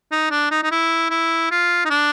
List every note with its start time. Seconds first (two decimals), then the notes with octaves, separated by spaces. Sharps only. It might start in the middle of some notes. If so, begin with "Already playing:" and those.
0.11 D#4
0.31 D4
0.51 D#4
0.63 D#4
0.71 E4
1.10 E4
1.51 F4
1.85 D#4
1.90 D4